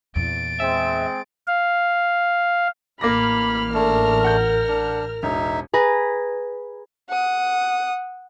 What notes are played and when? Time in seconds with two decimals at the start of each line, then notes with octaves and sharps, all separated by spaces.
0.15 E2 A#2 A6 D7
0.60 G#3 C4 E5
1.47 F5
3.01 A1 A#3 B5 D6 F6 A#6
3.74 A3 D4 A#4
4.24 F#5 G6
4.69 D4
5.23 E1 D#4 E5
5.73 G#4 B4 A#5
7.09 F#5 D#6